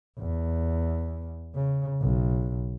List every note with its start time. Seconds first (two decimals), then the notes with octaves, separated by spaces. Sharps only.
0.19 E2
1.55 C#3
2.01 B1